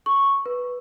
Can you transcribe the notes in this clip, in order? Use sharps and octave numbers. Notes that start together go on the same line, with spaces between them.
C#6
B4